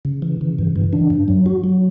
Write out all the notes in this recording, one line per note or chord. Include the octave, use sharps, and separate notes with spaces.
C#3
E3
C#3
G2
E3
D4
G2
F#3
F#4
F#3